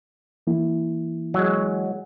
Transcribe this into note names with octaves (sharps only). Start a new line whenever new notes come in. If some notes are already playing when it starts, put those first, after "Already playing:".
E3 A#3 E4
F#3 G#3